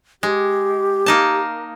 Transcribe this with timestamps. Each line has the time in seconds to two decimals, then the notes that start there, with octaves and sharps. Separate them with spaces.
0.23 G#3 G4
1.06 A#3 D#4 A5